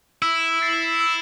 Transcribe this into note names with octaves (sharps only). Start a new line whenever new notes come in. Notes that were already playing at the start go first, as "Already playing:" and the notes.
E4 E6
A6 C7
E6